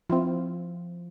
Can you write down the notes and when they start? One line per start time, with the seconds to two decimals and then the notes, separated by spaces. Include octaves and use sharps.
0.10 F3 C4 E4 F4